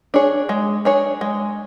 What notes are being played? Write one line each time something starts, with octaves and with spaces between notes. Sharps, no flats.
D4 G#4 C#5
G#3
D4 G#4 C#5
G#3